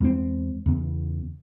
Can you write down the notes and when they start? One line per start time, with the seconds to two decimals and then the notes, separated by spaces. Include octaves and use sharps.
0.01 E2 G#3 B3 C4
0.66 E2 C#3 B3